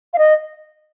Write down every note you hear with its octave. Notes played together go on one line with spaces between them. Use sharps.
F5
D#5